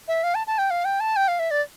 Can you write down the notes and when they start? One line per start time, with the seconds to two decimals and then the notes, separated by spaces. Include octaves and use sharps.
0.08 E5
0.24 F5
0.35 A5
0.47 A5
0.58 G5
0.71 F5
0.85 G5
1.00 A5
1.16 G5
1.28 F5
1.39 E5
1.51 D5